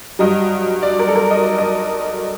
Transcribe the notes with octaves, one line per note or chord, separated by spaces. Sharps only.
G2 F#3 D#5
D5
A#4
A4
A#4
D#5
D5
D#5